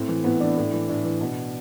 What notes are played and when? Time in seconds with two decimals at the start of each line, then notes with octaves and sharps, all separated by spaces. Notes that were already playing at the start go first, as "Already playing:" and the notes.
Already playing: A2 C4
0.08 E3
0.24 A2 B3
0.40 E3 D4
0.57 A2
0.73 E3
0.89 A2 D4
1.04 E3
1.21 B2